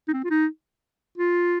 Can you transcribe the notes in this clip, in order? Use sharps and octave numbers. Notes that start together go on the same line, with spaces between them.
D#4
C4
F4
D#4
F4